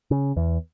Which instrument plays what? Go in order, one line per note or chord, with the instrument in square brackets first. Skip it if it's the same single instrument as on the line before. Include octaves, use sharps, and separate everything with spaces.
[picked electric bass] C#3
E2